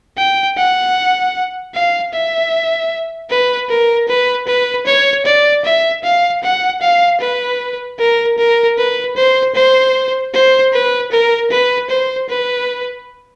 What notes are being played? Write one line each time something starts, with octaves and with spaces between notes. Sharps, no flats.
G5
F#5
F5
E5
B4
A#4
B4
B4
C#5
D5
E5
F5
F#5
F5
B4
A#4
A#4
B4
C5
C5
C5
B4
A#4
B4
C5
B4